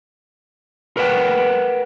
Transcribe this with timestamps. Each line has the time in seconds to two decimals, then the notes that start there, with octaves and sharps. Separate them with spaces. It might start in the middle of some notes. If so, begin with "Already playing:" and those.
0.97 A#4 B4 C#5 F#5 G5